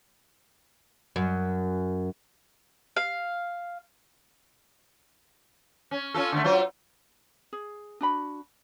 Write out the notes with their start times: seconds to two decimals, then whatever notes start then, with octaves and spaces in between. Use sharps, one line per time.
1.16 F#2
2.96 F5
5.91 C#4
6.14 C#4 F4 A4
6.32 D3 D#3 A3
6.44 F#3 F4 C5
7.53 G#4
8.01 D4 F#4 B5